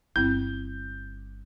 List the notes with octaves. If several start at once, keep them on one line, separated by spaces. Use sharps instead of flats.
G1 C4 E4 G6